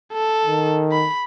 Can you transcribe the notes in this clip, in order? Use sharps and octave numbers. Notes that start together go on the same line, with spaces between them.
A4
D#3
B5